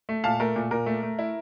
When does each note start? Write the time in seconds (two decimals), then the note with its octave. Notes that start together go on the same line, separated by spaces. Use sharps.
0.09 A3
0.24 A#2 F5 A5
0.40 A3 A#4
0.56 A#2
0.71 A#2 A#4
0.86 A3
1.03 A3
1.19 E4